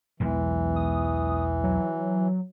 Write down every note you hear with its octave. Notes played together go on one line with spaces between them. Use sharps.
B1 E2 E3 G#3
D#6
F#3